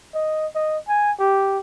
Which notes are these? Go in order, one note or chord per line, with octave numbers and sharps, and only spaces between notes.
D#5
D#5
G#5
G4